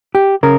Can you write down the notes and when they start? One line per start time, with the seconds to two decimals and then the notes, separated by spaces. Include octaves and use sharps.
0.15 G4
0.43 C#3 A#4